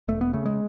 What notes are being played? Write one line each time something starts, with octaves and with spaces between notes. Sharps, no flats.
E1 A3
B3
C#3 A3
G#3